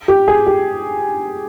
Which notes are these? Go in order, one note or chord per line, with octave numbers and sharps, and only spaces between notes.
G4
G#4
G4